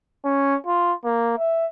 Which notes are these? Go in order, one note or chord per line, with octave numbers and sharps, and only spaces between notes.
C#4
F4
A#3
E5